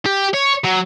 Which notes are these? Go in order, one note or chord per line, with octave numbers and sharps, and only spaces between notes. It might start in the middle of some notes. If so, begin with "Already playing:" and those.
G4
C#5
F#3